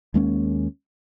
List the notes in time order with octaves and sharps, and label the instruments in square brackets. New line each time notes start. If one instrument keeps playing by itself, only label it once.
[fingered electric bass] D#2 G#3 A#3 C#4